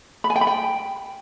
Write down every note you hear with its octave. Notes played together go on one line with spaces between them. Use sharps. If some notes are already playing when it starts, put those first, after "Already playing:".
B5
G#5
G5
B5
G5